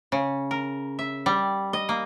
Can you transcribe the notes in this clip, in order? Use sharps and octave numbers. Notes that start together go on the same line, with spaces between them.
C#3
A#4
E5
G3
D#5
A#3